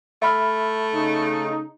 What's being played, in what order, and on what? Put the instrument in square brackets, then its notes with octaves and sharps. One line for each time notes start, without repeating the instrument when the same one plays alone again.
[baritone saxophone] A3 [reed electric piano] E5 B5 F6
[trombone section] C#3 D#4